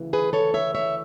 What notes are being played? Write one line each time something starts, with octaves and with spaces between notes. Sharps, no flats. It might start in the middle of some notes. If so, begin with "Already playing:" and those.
Already playing: D2 C#3 E3
G#4 B4
A4 C#5
C#5 E5
C#5 E5